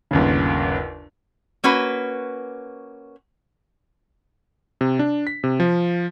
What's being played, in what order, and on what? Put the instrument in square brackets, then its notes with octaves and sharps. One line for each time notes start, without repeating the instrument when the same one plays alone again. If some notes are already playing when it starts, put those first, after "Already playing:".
[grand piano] G1 D#2 C#3
[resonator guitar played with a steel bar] A#3 C#4 F#4 B4
[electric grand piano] C3
D4
B6
C3
F3